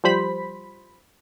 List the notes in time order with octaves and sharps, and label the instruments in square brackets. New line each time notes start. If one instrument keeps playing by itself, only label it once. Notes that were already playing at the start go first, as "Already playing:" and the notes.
[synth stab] F3 G3 C5 B5 B6